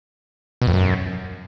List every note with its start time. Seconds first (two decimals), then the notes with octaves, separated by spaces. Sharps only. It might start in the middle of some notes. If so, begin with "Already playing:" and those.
0.62 B2
0.67 F2
0.73 F#2